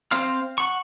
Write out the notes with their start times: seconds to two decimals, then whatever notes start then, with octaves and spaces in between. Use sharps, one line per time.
0.11 C4 C5 F5 C6 F6
0.58 F#5 C#6